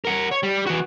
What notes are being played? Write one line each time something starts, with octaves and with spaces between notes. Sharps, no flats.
A#4 F#5
C#5
G3
E3 F#4